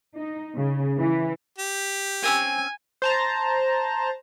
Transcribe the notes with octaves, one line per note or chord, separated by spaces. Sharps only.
D#4
C#3
E3
G4
A#3 C4 C#4 G#5
C5 A5 A#5